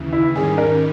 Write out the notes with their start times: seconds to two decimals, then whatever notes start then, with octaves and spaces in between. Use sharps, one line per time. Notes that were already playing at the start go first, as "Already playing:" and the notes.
Already playing: D#2 C#3 E3
0.13 E4
0.35 G#2 D#3 G3 C#4 G#4
0.58 A#4